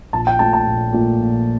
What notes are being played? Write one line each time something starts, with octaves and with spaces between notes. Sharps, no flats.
A#1 A5
G5
A#2 A3 A5
A5
A#1
A#2 A3
A#1